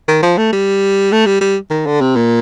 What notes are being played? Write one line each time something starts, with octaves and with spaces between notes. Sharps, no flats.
D#3
F3
A3
G3
A3
G3
G3
D#3
D3
C3
A#2